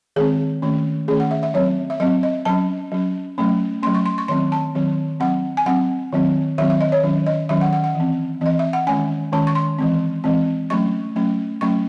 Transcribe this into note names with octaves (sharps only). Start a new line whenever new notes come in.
D#3 G#3 C4 G#4
D#3 A3 C#4
D#3 A3 C#4 G#4
F#5
E5
E5
F#3 C4 C#5
E5
F#3 C4 D#5
D#5
F#3 C#4 A5
F#3 C#4
F#3 A3 C#4
F#3 A3 C#4 C6
C#6
C6
C#6
D#3 F#3 C4 C6
A5
D#3 F#3 C4
F#3 C4 F#5
G#5
F#3 C4 F#5
D#3 F#3 C4
D#3 F#3 C4 E5
E5
D#5
C#5
D#3 F#3 C#4
D#5
D#3 F#3 C#4 E5
F#5
F#5
F#5
E3
C4
E3 C4 D#5
E5
F#5
D#3 G#3 C#4 G#5
D#3 G#3 C#4 A5
C#6
C6
E3 G#3 C4
E3 G#3 C4
F#3 A3 C#4 C#6
F#3 A3 C#4
F#3 A3 C#4 C#6